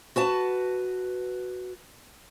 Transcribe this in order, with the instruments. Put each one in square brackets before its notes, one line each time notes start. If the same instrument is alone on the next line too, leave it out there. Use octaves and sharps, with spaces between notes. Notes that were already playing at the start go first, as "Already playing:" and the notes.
[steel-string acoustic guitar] F#4 B4 A5